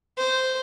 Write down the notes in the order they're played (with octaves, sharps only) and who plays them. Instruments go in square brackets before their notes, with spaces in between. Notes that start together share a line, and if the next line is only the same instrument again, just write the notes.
[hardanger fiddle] C5